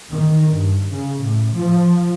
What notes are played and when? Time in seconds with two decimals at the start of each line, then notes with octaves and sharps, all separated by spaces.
0.11 D#3
0.51 G2
0.92 C#3
1.22 A2
1.55 F3